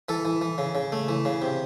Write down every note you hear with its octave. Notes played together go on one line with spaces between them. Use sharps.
E3 A4
E3
E3
C#3
C#3
A3
E3
C#3
C3